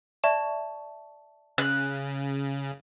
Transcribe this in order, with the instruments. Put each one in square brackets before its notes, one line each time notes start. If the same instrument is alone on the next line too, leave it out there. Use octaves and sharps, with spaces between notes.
[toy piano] D5 E5 C#6 [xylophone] A5
[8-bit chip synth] C#3 [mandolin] F#6